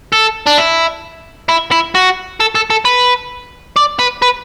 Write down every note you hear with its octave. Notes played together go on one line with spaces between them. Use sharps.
A4
D4
E4
E4
E4
F#4
A4
A4
A4
B4
D5
B4
B4